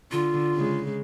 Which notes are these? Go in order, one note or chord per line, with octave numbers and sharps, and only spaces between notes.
D3 F4
C#3 G#3